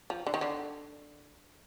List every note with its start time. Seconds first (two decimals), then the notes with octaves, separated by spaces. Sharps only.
0.10 F3
0.27 D3
0.34 D#3
0.41 D3